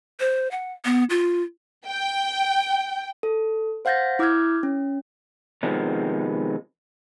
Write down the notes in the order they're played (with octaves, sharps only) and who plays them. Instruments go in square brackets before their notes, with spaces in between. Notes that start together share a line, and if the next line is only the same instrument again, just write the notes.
[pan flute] C5
F#5
B3
F4
[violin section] G5
[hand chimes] A4
C5 F5 F#5 G6 A6 A#6
E4 D6 E6 F6 G6 G#6
C#4
[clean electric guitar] C3 D#3 F3 G#3 B3 C4